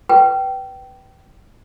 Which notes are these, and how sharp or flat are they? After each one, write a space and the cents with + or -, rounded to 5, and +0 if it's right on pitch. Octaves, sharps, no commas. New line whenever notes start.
B4 +0 G5 -20